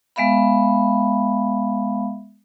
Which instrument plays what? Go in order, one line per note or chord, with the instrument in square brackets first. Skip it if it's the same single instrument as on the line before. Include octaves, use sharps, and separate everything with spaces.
[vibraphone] G#3 B3 E5 F5 B5